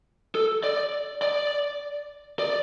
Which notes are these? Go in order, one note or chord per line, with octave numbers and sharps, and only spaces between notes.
A4
D5
D5
D5